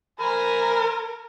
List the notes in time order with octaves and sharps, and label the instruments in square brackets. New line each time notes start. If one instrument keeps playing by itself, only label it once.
[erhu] A#4 [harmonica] C5 G#5 B5